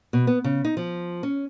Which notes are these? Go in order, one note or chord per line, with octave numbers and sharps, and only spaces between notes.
B2
B3
C#3
D#4
F3
C#4